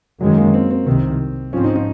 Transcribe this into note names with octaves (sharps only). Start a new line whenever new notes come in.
F#2 D#3 F#3 G#3
A#3
C4
C4
C2 C3 D#3 C4
G#2 F3 C4 C#4
D#4
D#4